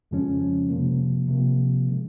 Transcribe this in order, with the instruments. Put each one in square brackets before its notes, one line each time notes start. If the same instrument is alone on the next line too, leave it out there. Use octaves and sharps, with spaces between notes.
[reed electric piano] F2 C#3 F3 G#3 C#4
C3 F3 A#3
C3 F3 A#3
C#3 G#3